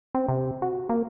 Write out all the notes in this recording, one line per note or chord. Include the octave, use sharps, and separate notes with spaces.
C4
C3
F#4
A#3